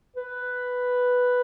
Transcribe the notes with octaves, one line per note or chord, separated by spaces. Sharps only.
B4